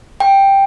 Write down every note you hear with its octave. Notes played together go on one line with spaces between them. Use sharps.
G5